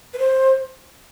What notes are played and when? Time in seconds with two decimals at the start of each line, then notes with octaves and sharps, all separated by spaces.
0.14 B4
0.18 C5